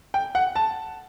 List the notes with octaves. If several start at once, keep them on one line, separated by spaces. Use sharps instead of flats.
G5
F#5
A5